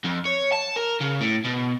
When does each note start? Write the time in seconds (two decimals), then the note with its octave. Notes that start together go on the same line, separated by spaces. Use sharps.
0.05 F2
0.26 C#5
0.52 A5
0.76 A#4
1.00 C#3
1.21 A2
1.45 B2